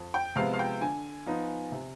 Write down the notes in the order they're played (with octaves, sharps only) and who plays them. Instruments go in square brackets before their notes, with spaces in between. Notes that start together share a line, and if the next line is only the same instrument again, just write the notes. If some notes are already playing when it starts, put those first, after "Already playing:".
Already playing: [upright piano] F2
G5
C3 F3 G#3 B3 F5
F5
G5
D3 G#5
F3 B3 D#4
C3